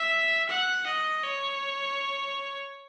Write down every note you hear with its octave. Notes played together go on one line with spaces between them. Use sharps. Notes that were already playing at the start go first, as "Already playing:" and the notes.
Already playing: E5
F#5
D#5
C#5